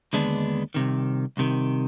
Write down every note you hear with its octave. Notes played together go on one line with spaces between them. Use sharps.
D#2 D3 G#3 B3 D4
C2 C3 D#3
C2 C3 D#3